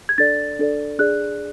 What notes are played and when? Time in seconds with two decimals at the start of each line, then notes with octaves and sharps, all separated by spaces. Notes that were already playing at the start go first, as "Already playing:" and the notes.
0.09 G#6
0.18 D4 A4 D5 A6
0.59 D4 A4 D5
0.99 D4 G#4 D5 F#6